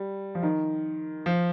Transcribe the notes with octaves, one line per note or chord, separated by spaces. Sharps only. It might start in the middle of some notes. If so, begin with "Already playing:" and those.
Already playing: G3
F3
D#3
F3